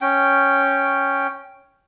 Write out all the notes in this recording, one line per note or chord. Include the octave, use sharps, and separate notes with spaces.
C#4 G5